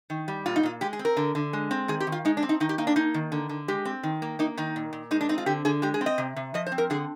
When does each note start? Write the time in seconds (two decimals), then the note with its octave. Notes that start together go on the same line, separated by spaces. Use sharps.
0.10 D#3
0.28 G3
0.46 A#2 F4
0.56 D#4
0.63 A#2 F4
0.81 G#3 G4
0.93 G#4
0.99 C4
1.05 A#4
1.17 D3
1.35 D3
1.53 G#3
1.71 C4
1.88 D#3 G#4
2.00 G4
2.07 D#3
2.12 F4
2.25 G#3 D#4
2.37 D4
2.43 C4
2.49 D#4
2.60 D#3 D#4
2.69 G4
2.78 A#3 D#4
2.87 D4
2.96 A#3 D#4
3.14 D#3
3.32 D3
3.49 D3
3.68 G#3 G4
3.85 C4
4.03 D#3
4.22 A#3
4.39 A#3 D#4
4.57 D#3 D#4
4.76 A#2
4.93 A#2
5.11 G#3 D#4
5.21 D4
5.29 C4 D#4
5.38 F4
5.46 D3 G4
5.65 D3 G#4
5.82 G#3 G4
5.94 G#4
6.01 C4
6.06 D#5
6.18 C3
6.36 C3
6.54 F3 D#5
6.66 C5
6.72 C4
6.78 A#4
6.90 D3 G#4